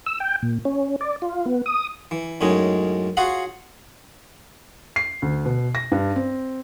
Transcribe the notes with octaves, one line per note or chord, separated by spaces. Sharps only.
E6
G5
A#2
C#4
D5
F4
B3
D#6
E3
F#2 A2 G#3 C#4 D#4
F4 F#4 G#4 C#5 F5 F#5
C7
D2
B2
A#6
G2
C4